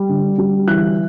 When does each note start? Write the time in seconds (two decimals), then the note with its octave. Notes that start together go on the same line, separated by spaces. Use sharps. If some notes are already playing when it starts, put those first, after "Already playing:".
Already playing: G3
0.09 D3
0.38 G3
0.67 E3 F#6